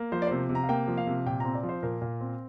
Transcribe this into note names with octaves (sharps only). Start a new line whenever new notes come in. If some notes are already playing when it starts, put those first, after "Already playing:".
Already playing: A#3
F3 C5
D5
C3 C5
C3
A#5
F5
A#3 G5
F3
F5
C3
A#2 G5
C4 A#5
D5
F3
C5
A#2 A#4
A#2
C4